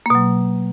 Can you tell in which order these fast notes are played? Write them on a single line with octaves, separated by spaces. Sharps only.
A#3 B2 F#3